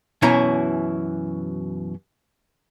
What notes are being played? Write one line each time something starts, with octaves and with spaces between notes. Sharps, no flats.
F#2 B2 E3 C#4 E4 A#5